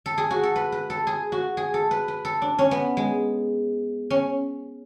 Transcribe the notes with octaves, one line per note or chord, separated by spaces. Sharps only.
A4
G#4
F#4
A4
B4
B4
A4
G#4
F#4
G#4
A4
B4
B4
A4
D4
C#4
B3
G#3
C#4